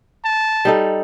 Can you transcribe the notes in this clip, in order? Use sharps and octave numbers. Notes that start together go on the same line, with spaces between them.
A5
G3 D#4 A4